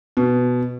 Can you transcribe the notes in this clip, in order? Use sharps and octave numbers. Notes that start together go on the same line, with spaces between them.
B2